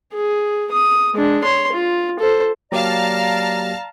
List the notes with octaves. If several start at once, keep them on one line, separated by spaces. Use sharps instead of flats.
G#4
D#6
G#3 D4
C#5 C6
F4
A4 C5
F#3 A#3 G4 D5 F5 A5 A#5 F6